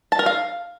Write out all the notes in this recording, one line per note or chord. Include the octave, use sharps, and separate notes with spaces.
A5
A#4
F5